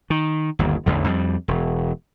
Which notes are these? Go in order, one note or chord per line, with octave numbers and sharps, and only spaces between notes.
D#3
G1 D#2
A1 E2 D3
F2 G3
E1